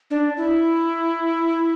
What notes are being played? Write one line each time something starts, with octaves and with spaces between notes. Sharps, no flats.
D4
E4